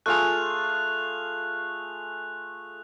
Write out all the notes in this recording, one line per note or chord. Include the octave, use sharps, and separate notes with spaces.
A3 F4 G#4 F#6 F7